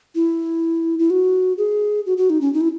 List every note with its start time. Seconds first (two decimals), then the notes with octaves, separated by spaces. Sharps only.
0.15 E4
0.99 E4
1.10 F#4
1.58 G#4
2.06 F#4
2.18 F#4
2.30 D#4
2.41 C#4
2.54 D#4
2.61 E4